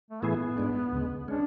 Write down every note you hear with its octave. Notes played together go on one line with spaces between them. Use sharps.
A3
A2 E3 A3 B3 E4 G#4
G#2 G#3 D4
D2 C#3 G#3
G#3 C#4 D4